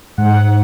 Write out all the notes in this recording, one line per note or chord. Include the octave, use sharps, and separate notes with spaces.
G#2 F#5